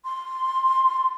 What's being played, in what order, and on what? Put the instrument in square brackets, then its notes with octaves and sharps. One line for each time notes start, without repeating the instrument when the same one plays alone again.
[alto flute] C6